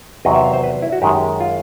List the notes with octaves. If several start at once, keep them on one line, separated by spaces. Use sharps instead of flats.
E2 C3 D#3 F#3 D#5
E5
F5
C5
B4
E4
F#4
F#2 D#3 G#3 G4
F4